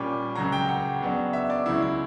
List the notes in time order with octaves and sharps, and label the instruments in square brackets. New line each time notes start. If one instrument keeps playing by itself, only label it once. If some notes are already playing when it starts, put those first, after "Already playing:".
Already playing: [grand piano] A#2 G3 C#4 D6
C#2 C#3 F#3 A#5
G5
F#5
C#3 F#3 B3 D4
E5
D5
C#2 C#3 F#3 E4
E4